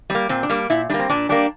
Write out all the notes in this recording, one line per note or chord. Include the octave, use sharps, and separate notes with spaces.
G3 A#3 C4
A#2 C4
D4
G3 A#3
A#2 E4
G3 A#3 D4
C4
A#2 D4
G3 A#3 D4